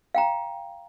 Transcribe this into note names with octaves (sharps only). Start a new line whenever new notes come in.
F5 G5 A#5